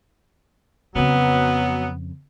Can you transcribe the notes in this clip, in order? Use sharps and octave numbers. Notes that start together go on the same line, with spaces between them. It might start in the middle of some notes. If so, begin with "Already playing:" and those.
F2 C#3 F#3 B3